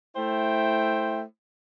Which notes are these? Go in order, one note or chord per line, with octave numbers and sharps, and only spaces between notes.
A3 E4 C5 E5 G5